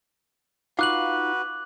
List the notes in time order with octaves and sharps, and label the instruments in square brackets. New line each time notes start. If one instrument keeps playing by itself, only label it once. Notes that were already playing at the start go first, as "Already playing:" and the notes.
[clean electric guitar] D#4 F4 F5 [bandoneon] F#4 B4 [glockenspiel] D6 F#6 F#7